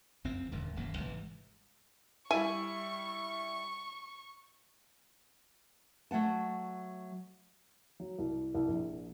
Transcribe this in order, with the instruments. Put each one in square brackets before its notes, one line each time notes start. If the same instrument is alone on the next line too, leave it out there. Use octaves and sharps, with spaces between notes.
[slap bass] F#1 F2 C4
D#1 G#2 D3
D#1 F#2 A#3
G1 G#2 C3 E3
[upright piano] G3 E4 [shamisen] G#5 [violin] C#6
[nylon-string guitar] F#3 A3 F#5 A5
[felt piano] F#3
C2
C2
A#1